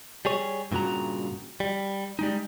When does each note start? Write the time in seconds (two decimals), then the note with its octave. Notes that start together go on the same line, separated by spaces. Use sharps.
0.25 G3 G#4 C#5
0.72 G2 A#2 C#3 F#4 A#5
1.60 G3
2.19 G3 G#3 D#4